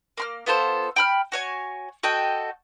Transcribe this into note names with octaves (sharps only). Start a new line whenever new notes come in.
A#3 C6 F6
B3 F4 A4 C5
G5 B5 F6
F#4 C#5 G#5
F#4 A4 D#5 G5